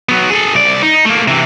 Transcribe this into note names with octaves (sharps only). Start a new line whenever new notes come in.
F#3 B3
G#4 A4
C2 D5
D#4
A3 A#3
C3 E3